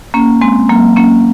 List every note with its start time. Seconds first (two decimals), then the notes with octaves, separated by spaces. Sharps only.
0.14 A#3 C#4
0.41 G#3 C4
0.69 F#3 A#3
0.96 A#3 C#4